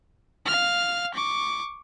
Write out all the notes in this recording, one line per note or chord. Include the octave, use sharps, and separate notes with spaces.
F5 F6
C#6 D6